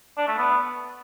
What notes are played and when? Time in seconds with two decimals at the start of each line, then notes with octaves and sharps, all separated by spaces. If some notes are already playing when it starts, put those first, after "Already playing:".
0.18 D4
0.28 A3
0.38 B3